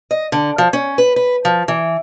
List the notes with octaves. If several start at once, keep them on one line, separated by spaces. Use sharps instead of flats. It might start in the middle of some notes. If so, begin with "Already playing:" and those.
D#5
D3
F3
C#4
B4
B4
F3
E3